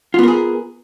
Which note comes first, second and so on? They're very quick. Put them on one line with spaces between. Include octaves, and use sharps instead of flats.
F4 B3 A#4 G#4